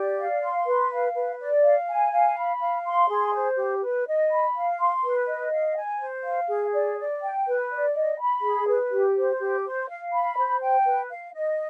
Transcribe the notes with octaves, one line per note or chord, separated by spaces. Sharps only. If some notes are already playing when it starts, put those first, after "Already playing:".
Already playing: G4 D5
F5
C6
B4
F5
B4
D5
F5
G#5
F5
B5
F5
C6
G#4
C5
G4
B4
D#5
B5
F5
C6
B4
D#5
F5
G#5
C5
F5
G#4
D5
D5
G5
B4
D5
D#5
B5
G#4
B4
G4
C5
G4
C5
F5
B5
C5
G5
B4
F5
D#5